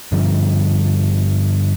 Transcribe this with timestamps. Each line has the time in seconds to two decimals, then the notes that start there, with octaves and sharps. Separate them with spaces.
0.12 G2 D3 F3